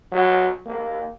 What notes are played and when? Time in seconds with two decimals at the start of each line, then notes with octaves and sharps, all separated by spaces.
0.12 F#3
0.66 A#3